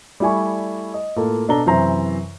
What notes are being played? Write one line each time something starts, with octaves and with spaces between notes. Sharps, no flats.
G3 A3 E4 D5 G#5 C#6
D#5
A2 A#3 F4 A4
B2 D4 A4 A#5 G7
F#2 C3 E3 C5 E5 A#5